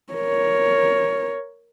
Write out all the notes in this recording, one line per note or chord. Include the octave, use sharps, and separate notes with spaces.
A#4 C#5